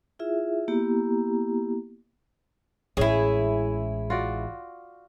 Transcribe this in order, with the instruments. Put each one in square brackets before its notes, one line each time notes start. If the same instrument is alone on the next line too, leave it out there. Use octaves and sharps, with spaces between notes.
[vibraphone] E4 F4 G#4 E5
A#3 B3 E4 G4 A#5
[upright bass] A1 G#3 [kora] C#4 [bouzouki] E4 G#4
[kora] F4 F#4 D5